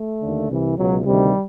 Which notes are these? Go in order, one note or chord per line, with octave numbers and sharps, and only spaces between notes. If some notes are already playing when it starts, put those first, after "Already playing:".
Already playing: A3
D#2 D3
C2 C3 E3
C#2 B2 F#3
D2 C3 D#3 G3